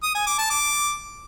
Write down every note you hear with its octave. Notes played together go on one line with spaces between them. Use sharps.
D#6
G#5
D6
A5
D6